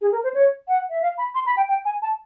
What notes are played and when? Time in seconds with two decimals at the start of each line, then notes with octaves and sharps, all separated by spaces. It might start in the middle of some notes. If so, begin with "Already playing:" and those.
0.01 G#4
0.12 A#4
0.24 C5
0.34 C#5
0.68 F#5
0.90 E5
1.02 F5
1.18 B5
1.35 C6
1.46 B5
1.57 G5
1.69 G5
1.85 G#5
2.02 A5